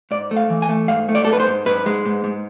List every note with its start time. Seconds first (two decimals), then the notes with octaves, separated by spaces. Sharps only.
0.11 G#2 D5
0.31 A3
0.37 F5
0.50 E3
0.62 G#5
0.69 A3
0.88 G#2 F5
1.09 A3
1.15 D5
1.25 G#2 A4
1.33 B4
1.40 C5
1.47 G#2
1.66 G#2 B4
1.86 G#3
2.05 G#2
2.24 G#2